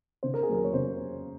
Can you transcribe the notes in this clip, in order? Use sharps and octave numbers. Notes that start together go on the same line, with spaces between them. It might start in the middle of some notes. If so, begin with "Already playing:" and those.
C#3 C5
A#4
G#4
F#3 A#3 A#4
C#5
C#3 C5